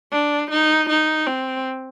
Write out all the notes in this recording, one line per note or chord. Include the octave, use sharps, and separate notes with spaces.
D4
D#4
D#4
C4